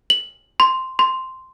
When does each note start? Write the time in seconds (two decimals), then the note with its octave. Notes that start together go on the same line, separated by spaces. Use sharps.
0.10 F#7
0.60 C6
0.99 C6